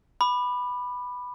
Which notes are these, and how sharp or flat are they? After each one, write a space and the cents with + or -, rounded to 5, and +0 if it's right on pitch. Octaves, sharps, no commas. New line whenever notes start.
B5 +0 D6 +35